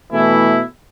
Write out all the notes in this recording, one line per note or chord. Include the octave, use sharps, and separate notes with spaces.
B2 E3 A3 E4